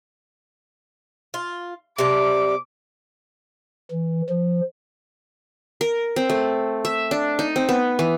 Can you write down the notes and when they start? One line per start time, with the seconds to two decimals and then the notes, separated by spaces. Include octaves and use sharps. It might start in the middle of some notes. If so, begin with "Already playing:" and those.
1.34 F4
1.98 C3 D4 D6
3.91 E3
4.29 F3
5.81 A#4
6.16 C4
6.30 A3
6.85 E5
7.11 D4
7.39 D#4
7.56 C4
7.69 B3
7.99 E3